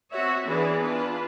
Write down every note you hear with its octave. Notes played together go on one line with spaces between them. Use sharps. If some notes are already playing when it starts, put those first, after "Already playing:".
C4 F#4 C#5 E5
E3 B3 D4 G#4 B4
D4 F4 B4